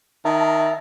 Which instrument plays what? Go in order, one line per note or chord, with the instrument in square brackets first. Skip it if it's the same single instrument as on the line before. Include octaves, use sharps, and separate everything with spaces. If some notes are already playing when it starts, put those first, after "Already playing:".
[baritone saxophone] D#3 [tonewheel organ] E5 A5 A#5